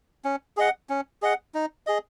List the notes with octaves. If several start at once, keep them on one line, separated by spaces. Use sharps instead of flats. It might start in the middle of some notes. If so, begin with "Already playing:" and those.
C#4
G#4 D#5 F#5
C#4
G#4 D#5 F#5
D#4
G#4 D#5